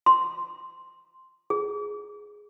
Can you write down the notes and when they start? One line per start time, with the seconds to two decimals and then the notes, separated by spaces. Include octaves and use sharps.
0.06 C6
1.50 G#4